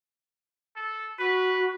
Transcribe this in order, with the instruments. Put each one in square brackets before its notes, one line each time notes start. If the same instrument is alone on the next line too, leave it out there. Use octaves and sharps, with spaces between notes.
[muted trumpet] A4
[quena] F#4 [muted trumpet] B4